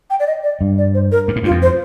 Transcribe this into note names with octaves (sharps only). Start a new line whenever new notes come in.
G5
D5
D#5
D5
G2
D5
C5
A#4
G2
A2
G2 F4
F2
C5